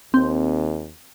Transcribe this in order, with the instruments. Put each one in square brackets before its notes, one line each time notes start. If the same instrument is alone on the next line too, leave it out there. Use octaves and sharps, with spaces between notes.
[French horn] D#2 [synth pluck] C4